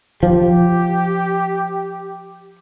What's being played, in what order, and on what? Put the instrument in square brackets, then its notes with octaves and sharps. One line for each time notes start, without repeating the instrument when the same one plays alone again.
[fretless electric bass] F3 [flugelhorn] G4